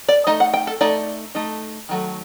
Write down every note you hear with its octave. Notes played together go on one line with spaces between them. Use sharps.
D5
A3 D#4 D#5
F#5
G5
A4
A3 D#4 D5
A3 D#4
D#3 F#3 A3